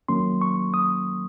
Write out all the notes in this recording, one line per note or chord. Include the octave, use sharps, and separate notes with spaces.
D#3 F#3 A#3 C#4 C6
C#6
D#6